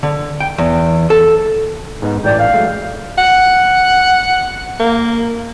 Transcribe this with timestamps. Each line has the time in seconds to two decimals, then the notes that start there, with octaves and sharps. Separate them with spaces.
0.03 D3
0.40 G5
0.58 E2
1.10 A4
2.02 G#2 B3 D#4
2.24 A1 E3 D5 G5
2.39 F5
2.54 F#3 G#3 A3
3.18 F#5
4.80 A#3